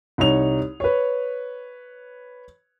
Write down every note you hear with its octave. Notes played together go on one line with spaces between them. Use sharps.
C2 G3 D#4 C#5 F7
B4 C#5